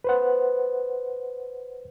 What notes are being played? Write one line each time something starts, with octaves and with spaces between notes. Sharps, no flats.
B4 C5 F#5